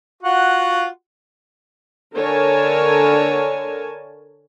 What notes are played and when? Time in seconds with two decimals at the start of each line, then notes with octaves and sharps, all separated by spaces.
0.23 F4 F#4 F#5
2.15 D3 A#4 C#5 G#5 A5